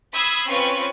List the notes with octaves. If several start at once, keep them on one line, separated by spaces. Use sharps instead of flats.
B5 D#6 E6 G#6 B6 C7
C4 C#4 F4 B4 C#6